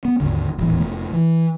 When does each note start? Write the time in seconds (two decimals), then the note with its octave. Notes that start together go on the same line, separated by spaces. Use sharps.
0.05 B3
0.20 G#1 D#2 D3
0.58 D#1 A1 E2 D#3
0.79 F1 B2 A3
1.13 E3